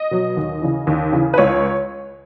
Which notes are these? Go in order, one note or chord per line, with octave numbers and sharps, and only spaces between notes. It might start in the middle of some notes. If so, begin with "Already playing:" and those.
Already playing: D#5
B2 F#3
D#2
C#3 E3
D#2
C#3 E3
B4
C#2 C#5